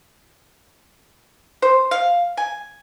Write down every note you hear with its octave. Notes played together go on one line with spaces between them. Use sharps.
C5
F5
G#5